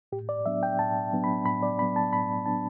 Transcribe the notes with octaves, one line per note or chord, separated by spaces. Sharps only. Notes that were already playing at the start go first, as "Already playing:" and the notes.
A2 G4
D5
F#3 B3 D4 E5
G5
A2 A5
F#3 B3 D4
B5
A2 B5
D5
F#3 B3 D4 B5
A5
A2 B5
F#3 B3 D4 A5